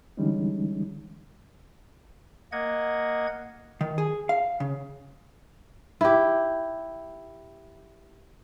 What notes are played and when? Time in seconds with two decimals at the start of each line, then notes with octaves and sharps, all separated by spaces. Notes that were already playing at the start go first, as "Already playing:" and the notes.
0.17 D3 E3 G3 G#3 C#4 D#4
2.52 A#3 D#5 F#5 G#6
3.81 D#3
3.98 G#4
4.29 F5
4.60 C#3
6.01 E4 G4